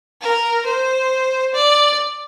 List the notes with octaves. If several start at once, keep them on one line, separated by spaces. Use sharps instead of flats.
A#4
C5
D5